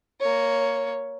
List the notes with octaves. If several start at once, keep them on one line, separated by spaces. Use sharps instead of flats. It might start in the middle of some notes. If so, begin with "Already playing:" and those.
A#3 C#5